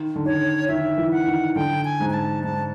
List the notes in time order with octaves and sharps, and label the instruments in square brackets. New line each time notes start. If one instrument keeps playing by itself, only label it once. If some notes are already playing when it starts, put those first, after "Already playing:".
Already playing: [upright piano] D#3
D3
[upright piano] D#3 [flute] C#5
[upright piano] D#3 [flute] E5
[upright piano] E3
[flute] F#5
[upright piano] D#3
[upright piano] D3 [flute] G5
[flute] G#5
[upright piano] G#2
[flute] G#5
A5
[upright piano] G#2 [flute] A5